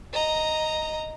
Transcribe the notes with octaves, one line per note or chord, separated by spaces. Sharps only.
D#5 A#5